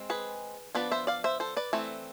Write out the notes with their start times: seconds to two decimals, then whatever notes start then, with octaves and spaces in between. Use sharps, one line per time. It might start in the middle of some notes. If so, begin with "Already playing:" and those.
Already playing: G#3 C4
0.10 G#4 B4
0.75 F3 B3 D4 B4 D5
0.91 C5 E5
1.07 D5 F5
1.24 C5 E5
1.40 A4 C5
1.57 B4 D5
1.73 E3 A3 C4